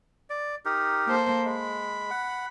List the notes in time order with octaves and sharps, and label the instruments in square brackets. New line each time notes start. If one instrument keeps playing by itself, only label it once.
[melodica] D5
D#4 G4 A#4
[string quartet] A#3 A4 C5
[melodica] G#3 [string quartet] B5
[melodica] F#5